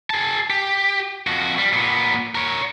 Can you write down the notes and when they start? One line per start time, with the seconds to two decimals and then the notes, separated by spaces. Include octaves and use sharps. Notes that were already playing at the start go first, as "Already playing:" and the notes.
0.10 G#4 A5
0.50 G4
1.27 F2 F#4
1.59 G3
1.73 A#2 B3
2.35 A#4 C#5